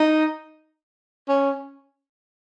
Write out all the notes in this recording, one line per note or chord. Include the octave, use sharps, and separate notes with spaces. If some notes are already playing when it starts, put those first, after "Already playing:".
Already playing: D#4
C#4